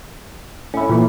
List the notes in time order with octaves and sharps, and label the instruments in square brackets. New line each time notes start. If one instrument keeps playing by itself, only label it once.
[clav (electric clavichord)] A2 E4 [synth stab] C#4
[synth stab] A#2 E3